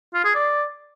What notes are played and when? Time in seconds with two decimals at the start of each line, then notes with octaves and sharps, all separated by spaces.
0.14 F4
0.25 G#4
0.35 D5